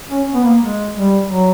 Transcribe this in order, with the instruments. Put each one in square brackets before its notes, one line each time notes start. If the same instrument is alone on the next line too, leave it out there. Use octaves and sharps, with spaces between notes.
[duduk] C#4
B3
A#3
G#3
G3
F#3